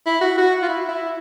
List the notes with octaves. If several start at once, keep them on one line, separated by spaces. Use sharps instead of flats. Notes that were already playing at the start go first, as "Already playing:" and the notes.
E4
F#4
F#4
F4
E4
E4